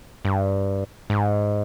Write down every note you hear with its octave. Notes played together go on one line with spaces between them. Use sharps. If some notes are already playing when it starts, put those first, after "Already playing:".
G2
G#2